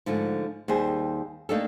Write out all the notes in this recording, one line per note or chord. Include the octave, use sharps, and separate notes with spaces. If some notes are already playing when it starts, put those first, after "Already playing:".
G#2 D3 F3 A3
D#2 G3 G#4 C5
A3 A#3 D4 D#4 G4 A4